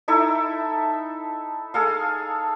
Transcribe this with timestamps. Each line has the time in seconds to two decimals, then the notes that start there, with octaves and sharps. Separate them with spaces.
0.08 D#4 E4 A4 E5
1.74 G#4 A4 F5